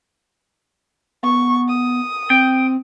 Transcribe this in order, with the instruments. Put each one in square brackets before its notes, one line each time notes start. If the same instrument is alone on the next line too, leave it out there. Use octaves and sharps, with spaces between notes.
[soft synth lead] B3 [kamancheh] C#6
[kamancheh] D#6
[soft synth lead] C4 [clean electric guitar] G5